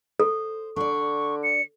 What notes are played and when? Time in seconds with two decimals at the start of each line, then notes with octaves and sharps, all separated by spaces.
0.20 A4 C5
0.76 D3 D4 D5 C#6
1.43 C#7